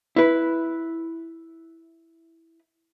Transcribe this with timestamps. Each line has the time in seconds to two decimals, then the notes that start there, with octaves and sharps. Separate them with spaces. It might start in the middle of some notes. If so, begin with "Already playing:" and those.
0.16 E4 B4